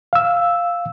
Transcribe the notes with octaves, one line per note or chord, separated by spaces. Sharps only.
F5 E6